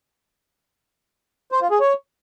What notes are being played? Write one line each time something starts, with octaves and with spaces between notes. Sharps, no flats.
C5
F4
G#4
C#5